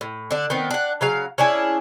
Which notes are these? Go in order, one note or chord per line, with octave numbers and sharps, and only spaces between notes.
A2
D3 D4
D#3 B3 C4
D4 F#5
C#3 F#3 F5
C#4 D4 E4 G#4